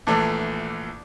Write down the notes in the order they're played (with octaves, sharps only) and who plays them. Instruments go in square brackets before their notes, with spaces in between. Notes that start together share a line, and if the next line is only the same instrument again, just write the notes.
[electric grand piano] A#1 E3 A3 [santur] D4